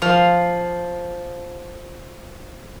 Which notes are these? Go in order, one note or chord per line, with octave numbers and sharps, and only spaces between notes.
F3 F5